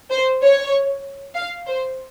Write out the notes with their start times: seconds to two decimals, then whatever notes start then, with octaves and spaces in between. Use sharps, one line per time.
0.11 C5
0.42 C#5
1.35 F5
1.67 C5